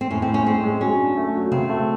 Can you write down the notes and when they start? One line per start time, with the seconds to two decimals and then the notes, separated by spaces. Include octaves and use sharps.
0.01 C4
0.11 A2 C#4
0.22 C4
0.28 A2
0.34 C#4
0.46 G#3 C4
0.64 G#3
0.81 F#3 C#4
0.99 D4
1.17 A3
1.35 F#3
1.52 C#3 C4
1.69 A3